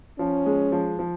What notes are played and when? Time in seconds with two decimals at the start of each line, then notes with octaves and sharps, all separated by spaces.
0.19 F3 C#4
0.46 G#3
0.72 F3
0.99 F3